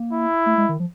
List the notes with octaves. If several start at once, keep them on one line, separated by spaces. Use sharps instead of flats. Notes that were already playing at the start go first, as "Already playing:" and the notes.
Already playing: A#3
E4
A3
G#3
D#3
F3